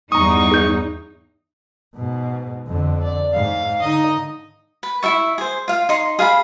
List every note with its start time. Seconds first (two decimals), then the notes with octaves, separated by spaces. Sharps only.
0.12 E2 G2 D#4 A#5 C#6 D#6
0.52 G#4 G6
1.95 G#2 B2
2.67 F2 D3
3.02 D5
3.34 G#2 F5
3.81 D3 D#4 D#5
4.83 B4
5.03 E4 G#4 E5 C#6
5.38 G#4 C5
5.68 F4 F5
5.89 D#4 C6
6.19 G#4 F5 G#5 B5